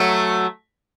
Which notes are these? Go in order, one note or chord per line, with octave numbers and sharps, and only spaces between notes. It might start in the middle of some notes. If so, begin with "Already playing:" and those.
Already playing: F#3 A3